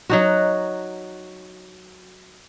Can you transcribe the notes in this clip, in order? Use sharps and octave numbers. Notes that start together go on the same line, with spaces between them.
F#3 D#4 F#4